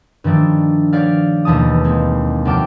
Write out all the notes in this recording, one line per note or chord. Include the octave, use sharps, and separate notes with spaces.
G2 D#3 F3 A3 D4
G4 C#5 D5 F5
E1 D#2 E3 A5 D#6
G#3 A#3 C4
F1 F#3 G5 A5 D6 F6